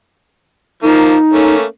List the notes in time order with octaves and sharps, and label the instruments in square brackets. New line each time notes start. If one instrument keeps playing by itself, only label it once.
[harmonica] F3 A#3 [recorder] D#4
[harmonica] A3 A#3 C#4